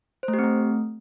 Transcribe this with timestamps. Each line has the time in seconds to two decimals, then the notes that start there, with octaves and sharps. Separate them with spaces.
0.23 C5
0.28 A3
0.33 G4
0.39 C4
0.44 A3